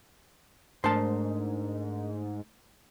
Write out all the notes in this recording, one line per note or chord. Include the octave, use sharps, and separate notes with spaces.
G#2 A3 D4 A#4 C5 A5